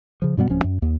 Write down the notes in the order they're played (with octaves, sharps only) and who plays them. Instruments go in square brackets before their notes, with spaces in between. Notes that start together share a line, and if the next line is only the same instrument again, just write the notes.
[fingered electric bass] C#3 F3
G2 B2 G3 B3
D1 F3 C#4
F#2
D#2